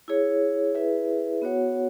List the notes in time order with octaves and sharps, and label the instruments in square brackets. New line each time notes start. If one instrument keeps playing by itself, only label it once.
[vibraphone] E4 G#4 C#5
E4 G#4 B4 E5
B3 F#4 C#5 F#5